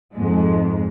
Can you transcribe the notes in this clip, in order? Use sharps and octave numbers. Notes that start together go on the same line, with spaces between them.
F2 G#2 G#3